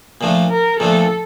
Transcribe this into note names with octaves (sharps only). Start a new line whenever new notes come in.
A#2 F3 A3 D4
A#4
A#2 F3 A3 D4 A4